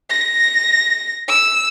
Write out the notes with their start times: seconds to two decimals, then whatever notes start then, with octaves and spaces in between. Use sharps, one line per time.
0.10 A#6
1.29 E6